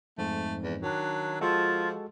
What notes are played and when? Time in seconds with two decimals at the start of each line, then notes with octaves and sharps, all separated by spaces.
0.18 F2 G#2 A3
0.62 E2
0.82 D#3 F#3 D4
1.41 F3 G#3 F4 F#4 A4